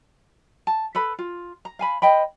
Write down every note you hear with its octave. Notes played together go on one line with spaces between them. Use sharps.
A5
A4 B4 B5
F4
A#5
F5 G#5 B5
C5 D#5 G5 B5